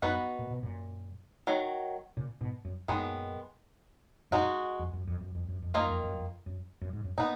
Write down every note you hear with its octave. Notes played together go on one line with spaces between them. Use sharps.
F#2 B3 D#4 F#4 B4
A#2
B2
F#2 A#2
D#3 F#3
A#2 C#3
G#2 B2
F#2
F#2 A#2 D#3 G#3 B3
F#2 A#2 G#3 D#4 F#4
F2
F#2
F2
F#2
F2
F#2
F2
F#2 D#3 A#3 F4 A#4 D#5
F2
F#2
F2
F#2
F#2
G#2
F#2
A#2 B3 D#4